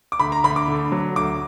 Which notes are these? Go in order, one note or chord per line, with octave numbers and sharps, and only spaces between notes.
D6
D2 B5
A#5
D2 B5
D6
D3
F#3
D2 D6